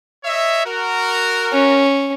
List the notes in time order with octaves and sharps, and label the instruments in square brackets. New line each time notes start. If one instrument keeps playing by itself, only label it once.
[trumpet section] C#5 D#5 E5
F#4 A#4
[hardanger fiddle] C#4